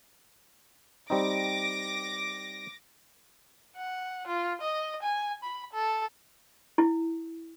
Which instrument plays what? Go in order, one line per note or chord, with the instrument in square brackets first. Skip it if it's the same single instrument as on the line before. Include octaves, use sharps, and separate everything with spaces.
[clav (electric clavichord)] G3 C4 D#4 [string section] D6 A#6
[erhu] F#5
F4
D#5
G#5
B5
A4
[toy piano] E4